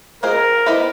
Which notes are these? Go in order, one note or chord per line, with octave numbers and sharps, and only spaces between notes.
C4 F4 G#4 A#4 C5 D#5
B3 E4 G4 C5 D#5